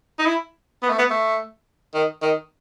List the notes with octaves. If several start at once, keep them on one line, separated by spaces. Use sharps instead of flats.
D#4
E4
B3
A3
B3
A3
D#3
D#3